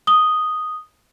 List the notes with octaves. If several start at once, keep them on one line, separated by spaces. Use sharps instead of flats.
D#6 G7